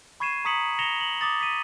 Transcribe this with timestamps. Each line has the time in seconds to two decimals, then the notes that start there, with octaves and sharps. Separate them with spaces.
0.20 B5 C#6 G#6 C7 D#7 E7
0.45 A#5 C#6 D#6 B6 C#7 F#7
0.79 A#6 C#7 E7 F7 G7
1.01 F#7
1.21 D6 D#6 A6
1.41 B6 D#7